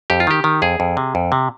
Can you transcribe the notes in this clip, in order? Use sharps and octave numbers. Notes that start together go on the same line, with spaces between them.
F2 G4
F4
D#3 G4
D#3
F2 G#4
F2
C3
F2
C3